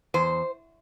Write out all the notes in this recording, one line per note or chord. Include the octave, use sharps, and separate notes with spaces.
E2 C5